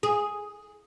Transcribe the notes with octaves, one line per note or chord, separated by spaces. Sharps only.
G#4